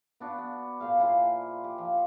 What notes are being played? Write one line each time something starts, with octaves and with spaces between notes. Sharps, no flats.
B3 D4 F#4
B3
A#2 G#4 F5
E4 F4 G#4 C5
G4
F3